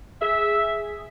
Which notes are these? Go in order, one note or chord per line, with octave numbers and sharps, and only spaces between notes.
G#4 E5